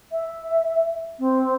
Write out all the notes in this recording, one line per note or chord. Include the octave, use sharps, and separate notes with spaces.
E5
C4